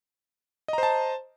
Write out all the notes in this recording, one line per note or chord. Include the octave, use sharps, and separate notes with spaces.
C5 D#5 A5 A#5